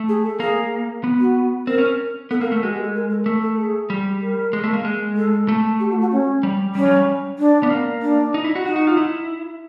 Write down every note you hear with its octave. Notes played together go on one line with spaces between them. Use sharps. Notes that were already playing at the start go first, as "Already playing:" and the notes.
Already playing: A3
G#4
A4
A#3 G#4
B3
F#4
C4 A#4
C#4
B3 A4
A#3 A#4
A4
A3 A#4
G#3 F#4
G4
A4
A#4
A4
A3 A#4
A4
G#4
G3
A#4
G#3
A3
A#3
G#3
A4
A3
G4
F#4
F#4
C#4
G3
G3 C#4
F#3
G3
D4
B3
A#3
D4
D#4
E4
F#4
D#4 F#4
F#4
F4
E4